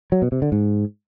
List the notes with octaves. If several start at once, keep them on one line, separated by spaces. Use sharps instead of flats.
F#3
B2
C3
D3
G#2